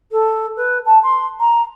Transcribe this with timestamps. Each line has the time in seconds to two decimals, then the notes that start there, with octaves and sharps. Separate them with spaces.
0.11 A4
0.56 B4
0.85 A5
1.03 C6
1.40 A#5